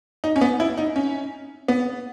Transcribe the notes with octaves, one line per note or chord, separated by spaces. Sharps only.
D#4
C#4
B3
E4
D#4
C#4
B3